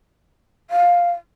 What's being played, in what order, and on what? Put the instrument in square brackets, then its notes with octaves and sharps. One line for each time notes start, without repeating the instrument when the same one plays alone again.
[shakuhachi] F5